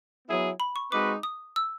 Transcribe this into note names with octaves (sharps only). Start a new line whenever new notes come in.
F#3 B3 E4 G#4
B5
C#6
G#3 C4 D#4 F#4 B4 D6
D#6
E6